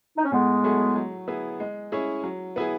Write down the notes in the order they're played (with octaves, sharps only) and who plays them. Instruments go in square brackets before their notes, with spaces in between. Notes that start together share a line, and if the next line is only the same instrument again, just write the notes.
[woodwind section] D#4
C#4
[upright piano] A2 [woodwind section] G#3 B3
[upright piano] F#3 A3 E4 G#4
F#3
B3 E4 G#4
G#3
C#4 E4 G#4
F#3
B3 E4 G#4